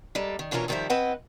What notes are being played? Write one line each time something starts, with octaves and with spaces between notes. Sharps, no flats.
G3 G#3 A#3 A4
D#3
B2 E3 C#4 D4 F4 A#4
F2 D#3 F3 G3 C5 E5
C4 E4 B4 D#5 F#5